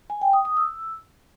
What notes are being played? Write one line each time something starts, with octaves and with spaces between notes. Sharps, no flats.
G#5
G5
D#6
D#6
E6